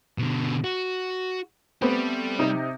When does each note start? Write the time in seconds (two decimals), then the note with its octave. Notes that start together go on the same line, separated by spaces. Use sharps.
0.18 B2 D3
0.64 F#4
1.82 G3 A3 B3 C4 G4
2.39 C3 D#4